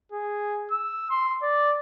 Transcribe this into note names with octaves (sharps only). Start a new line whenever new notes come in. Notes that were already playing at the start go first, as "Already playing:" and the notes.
G#4
E6
C6
D5